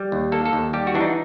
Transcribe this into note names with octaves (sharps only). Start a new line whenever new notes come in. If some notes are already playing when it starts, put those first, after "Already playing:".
Already playing: G3
D#2
A#3 A4
A4
D#2
G3 G4
F#4
E3 D4
D#4